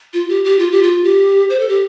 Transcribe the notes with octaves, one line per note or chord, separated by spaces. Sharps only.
F4
G4
G4
F4
G4
F4
G4
C5
A4
G4